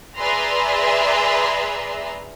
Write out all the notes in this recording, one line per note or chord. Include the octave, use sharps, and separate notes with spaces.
G#4 B4 D5 E5 A#5 C6